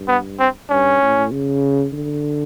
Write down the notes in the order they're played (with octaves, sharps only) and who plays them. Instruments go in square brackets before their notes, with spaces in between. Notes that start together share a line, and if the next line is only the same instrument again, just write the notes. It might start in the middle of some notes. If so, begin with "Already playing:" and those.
Already playing: [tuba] G2
[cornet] B3
C4
[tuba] G2 [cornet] C#4
[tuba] A2
C#3
D3